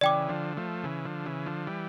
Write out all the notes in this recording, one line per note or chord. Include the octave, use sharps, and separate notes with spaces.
C#3 E3 D5 G5 D6
D3 F3
F3 A3
C#3 E3
D3 F3
C#3 E3
D3 F3
E3 G3